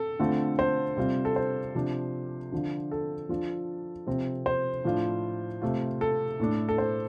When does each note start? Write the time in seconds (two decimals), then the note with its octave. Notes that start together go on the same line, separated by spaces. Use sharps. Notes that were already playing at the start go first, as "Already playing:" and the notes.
Already playing: A4
0.19 D3 A3 C4 F4
0.59 C5
0.97 C3 G3 C4 F4
1.25 A4
1.36 C5
1.75 C3 F3 D4
2.52 D3 F3 D4 F4
2.91 A4
3.29 F3 D4 F4
4.07 C3 F3 C4
4.46 C5
4.85 A2 F3 D4 F4
5.62 C3 A3 F4
6.01 A4
6.40 A2 A3 D4
6.69 A4
6.78 C5